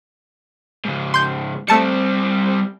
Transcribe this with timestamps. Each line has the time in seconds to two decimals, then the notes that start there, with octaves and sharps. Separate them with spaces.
0.85 G#2 C#3
1.14 C6 G6
1.68 G3 A3 C4 A5 C#7